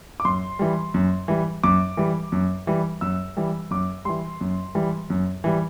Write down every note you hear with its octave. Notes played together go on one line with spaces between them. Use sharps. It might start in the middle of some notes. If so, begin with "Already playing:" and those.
D6
F#2 C6
E3 G3
F#2
E3 G3
F#2 D6
E3 G3
F#2
E3 G3
F#2 E6
E3 G3
F#2 D6
E3 G3 C6
F#2
E3 G3
F#2
E3 G3